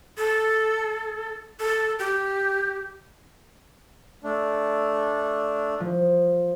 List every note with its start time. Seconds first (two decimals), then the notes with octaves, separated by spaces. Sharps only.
0.18 A4
1.60 A4
1.99 G4
4.24 A3 D4
5.80 F3